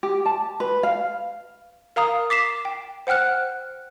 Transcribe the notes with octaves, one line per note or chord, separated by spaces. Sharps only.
G4
A5
B4
F5
A#4 F5 A#5 D#6
D6 B6 C7 E7
G5
C5 F#5 G5 F6 F#6